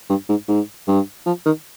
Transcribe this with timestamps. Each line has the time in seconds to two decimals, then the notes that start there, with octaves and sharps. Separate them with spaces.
0.09 G2
0.29 G#2
0.48 G#2
0.88 G2
1.26 F3
1.45 D#3